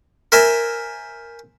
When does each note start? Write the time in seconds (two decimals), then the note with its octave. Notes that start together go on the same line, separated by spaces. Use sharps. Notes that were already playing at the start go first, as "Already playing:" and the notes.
0.32 A#4 C5 E5 G#5 A#5